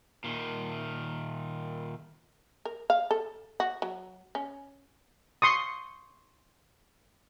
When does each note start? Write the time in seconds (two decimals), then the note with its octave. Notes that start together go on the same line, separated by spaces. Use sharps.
0.24 A#2 D#3
2.65 A#4
2.90 F5
3.11 A4
3.60 F#4
3.82 F#3
4.35 C#4
5.42 C6 C#6 D#6